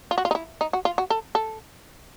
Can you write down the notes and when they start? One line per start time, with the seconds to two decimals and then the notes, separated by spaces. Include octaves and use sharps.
0.11 F4
0.18 F#4
0.25 F4
0.31 D#4
0.35 E4
0.61 D#4
0.73 F#4
0.85 F4
0.98 F#4
1.10 A4
1.35 A4